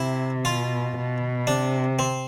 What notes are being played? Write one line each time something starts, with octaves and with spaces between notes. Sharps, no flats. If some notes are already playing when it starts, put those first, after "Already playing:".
Already playing: C3 E4
B2 F4
B2
C3 D4
C4